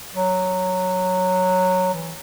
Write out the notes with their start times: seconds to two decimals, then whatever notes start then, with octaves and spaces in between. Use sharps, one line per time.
0.15 F#3
1.94 E3